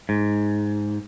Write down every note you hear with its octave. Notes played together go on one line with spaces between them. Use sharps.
G#2